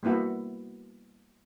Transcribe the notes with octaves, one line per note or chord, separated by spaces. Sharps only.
G3 A#3 B3 E4 F#4